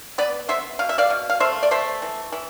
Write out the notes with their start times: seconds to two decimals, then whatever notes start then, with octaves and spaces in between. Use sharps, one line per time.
0.18 B3 B4 D5
0.49 B3 C5 E5
0.79 B2 F5
0.89 E5
0.98 D5 F5
1.10 B2
1.30 F5
1.40 A3 C5 E5
1.63 D5
1.71 A3 C5 E5
2.02 E3
2.32 E3